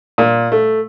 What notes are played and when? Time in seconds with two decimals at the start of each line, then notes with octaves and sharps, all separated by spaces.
0.18 A#2
0.52 A3